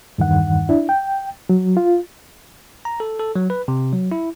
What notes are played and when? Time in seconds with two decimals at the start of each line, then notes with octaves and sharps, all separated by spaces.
0.18 E2 G2 D#3 F#5
0.69 D4 E4
0.89 G5
1.49 F#3
1.77 F4
2.85 A#5
3.00 A4
3.19 A4
3.36 F#3
3.50 B4
3.68 C3
3.93 F#3
4.12 E4